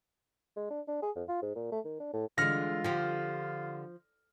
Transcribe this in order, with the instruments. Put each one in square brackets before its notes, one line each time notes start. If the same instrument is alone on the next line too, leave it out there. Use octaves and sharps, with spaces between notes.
[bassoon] G#3
D4
D4
G#4
F2
F4
G#2
A#2
A3
D#3
D4
A2
[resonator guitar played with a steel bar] D3 [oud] E3 G#3 [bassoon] F4 [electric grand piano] F6 A#6
[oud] D3 G4 [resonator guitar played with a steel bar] F3